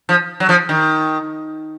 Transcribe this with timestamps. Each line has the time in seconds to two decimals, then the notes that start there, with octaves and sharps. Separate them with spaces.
0.09 F3
0.40 F#3
0.49 F3
0.69 D#3